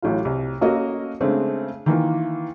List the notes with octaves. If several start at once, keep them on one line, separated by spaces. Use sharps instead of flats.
A1 A2 F#3 F4
C2
A#3 C#4 F#4 A4 A#4 D#5
C#3 G#3 A3 C4 D4
D#3 E3 A#3 F4